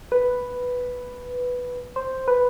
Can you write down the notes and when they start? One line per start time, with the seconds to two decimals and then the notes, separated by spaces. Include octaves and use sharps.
0.12 B4
1.96 C5
2.28 B4